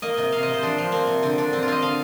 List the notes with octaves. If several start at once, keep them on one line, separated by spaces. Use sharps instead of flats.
A#3 D#5
C3 D#5
C3 F5
D#5
C3 C5
F3 D4
F3
A#3 C4
C3
D3 C4
D3 D4
C4
F4
C4 D#5
D3 F5